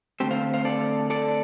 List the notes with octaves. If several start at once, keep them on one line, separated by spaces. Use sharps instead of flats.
D3 A3 C4 G4 C5
C5 F5
C5 F5
A4 D5
A4 D5